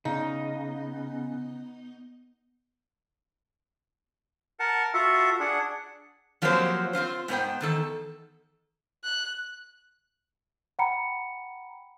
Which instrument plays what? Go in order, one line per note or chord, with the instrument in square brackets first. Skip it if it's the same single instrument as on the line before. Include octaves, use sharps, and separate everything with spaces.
[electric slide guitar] C#3 [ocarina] B3 [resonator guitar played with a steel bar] D#4
[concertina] A#4 F#5 A5
F4 F#4 A4 E5 F#5
D4 G#4 F#5
[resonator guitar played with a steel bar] F3 F#3 A#3 C4 G4 C5
C4 C#4 F4 C5
G#2 B3 C5 G5
E2 D#3 A4
[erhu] F#6
[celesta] F#5 G5 A#5 B5 C#7